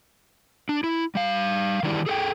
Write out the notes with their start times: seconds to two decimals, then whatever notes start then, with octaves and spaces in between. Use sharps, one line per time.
0.69 D4
0.84 E4
1.15 G3 F5
1.83 D#3 E3 G3 D4 E4
2.06 G#4 A4 E5 G5